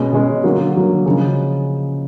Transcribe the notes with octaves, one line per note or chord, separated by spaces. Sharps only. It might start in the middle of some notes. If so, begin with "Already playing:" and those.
Already playing: B2 G#3 C#4
B2 G#3 C#4
D3 F#3 A#3
D3 F#3 A#3
C#3 F3 G#3